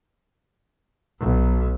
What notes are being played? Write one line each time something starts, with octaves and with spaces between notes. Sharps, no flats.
B1